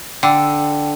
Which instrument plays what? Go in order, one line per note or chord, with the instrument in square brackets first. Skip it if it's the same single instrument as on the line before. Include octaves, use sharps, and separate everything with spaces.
[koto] D3 [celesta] G5